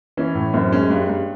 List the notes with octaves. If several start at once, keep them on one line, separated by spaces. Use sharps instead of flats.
E3 C#4
A2
F#2 C4
G#3 C#4
G2
G2